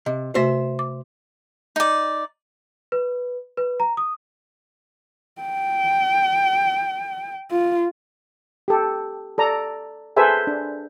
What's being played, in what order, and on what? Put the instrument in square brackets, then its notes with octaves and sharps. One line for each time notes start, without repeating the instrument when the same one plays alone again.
[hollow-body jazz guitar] C3 [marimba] D#5
[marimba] C3 A3 F#4 [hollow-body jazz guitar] C5 E5
[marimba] D6
[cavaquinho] D#4 D5
[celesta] B4
B4
A#5
D#6
[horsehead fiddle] G5
F4
[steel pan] G4 A4
A4 D5 A#5
G#4 A4 B4 C5 E5 G#5
D4